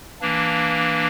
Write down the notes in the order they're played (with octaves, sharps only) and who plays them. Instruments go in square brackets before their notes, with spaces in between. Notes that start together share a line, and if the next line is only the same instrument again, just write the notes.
[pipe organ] E3 A#3 D4